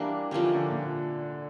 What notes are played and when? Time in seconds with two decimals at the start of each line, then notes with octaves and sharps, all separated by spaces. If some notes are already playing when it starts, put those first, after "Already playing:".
Already playing: E3 G3 A#3 D4 E4
0.31 D3 F3 A#3 C#4 G4
0.43 E3
0.55 D3
0.69 A#2